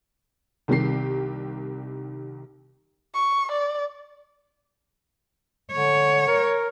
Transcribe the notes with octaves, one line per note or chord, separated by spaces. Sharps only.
C2 D#3 G3 G4 C7
C#6
D5
D3 C#5
A#4